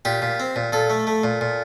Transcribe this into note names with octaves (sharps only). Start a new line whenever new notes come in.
A#2 G4
A#2
C4
A#2
A#2 A4
A3
A3
A#2
A#2